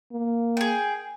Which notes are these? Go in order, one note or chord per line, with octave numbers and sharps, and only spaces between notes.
A#3
G#4 G5